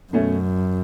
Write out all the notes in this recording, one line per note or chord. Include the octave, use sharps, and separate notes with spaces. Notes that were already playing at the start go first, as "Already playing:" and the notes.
F#2 B2 A3 C#4